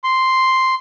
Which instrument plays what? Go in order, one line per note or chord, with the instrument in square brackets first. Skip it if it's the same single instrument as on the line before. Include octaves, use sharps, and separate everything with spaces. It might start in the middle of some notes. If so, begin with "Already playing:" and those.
[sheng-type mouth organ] C6